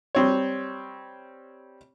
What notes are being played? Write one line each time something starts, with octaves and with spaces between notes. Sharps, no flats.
G3 C4 C#5